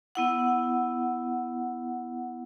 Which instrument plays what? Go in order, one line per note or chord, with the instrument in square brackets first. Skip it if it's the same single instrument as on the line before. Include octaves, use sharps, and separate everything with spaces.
[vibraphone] B3 E4 F#5